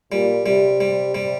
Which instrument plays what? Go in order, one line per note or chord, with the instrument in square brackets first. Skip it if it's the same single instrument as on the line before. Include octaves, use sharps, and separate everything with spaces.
[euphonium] A#2 [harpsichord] G3
[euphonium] C3 [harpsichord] G3
[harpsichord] G3
G3